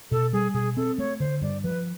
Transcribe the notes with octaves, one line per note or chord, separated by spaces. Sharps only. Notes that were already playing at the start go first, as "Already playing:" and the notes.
B2 A4
G3 G#4
B2 G#4
C4 A4
A3 C#5
D3 C5
G2 D5
F3 B4